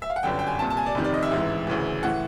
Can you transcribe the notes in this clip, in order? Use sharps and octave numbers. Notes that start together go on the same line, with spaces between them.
E5
F5
F#5
G1 F#2 D3 G5
G5
G#5
C2 A#2 A5
A5
G#5
D5
F1 F2 C3 D#3
D5
D#5
E5
A1 G#2 E3
D2 C#3 E3
A2 E3 F#5